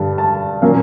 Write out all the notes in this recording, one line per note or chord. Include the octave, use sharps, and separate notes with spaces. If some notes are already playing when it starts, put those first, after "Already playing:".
Already playing: G2 D3 G3 A5
A5
A#2 F#3 A#3 C#4 F5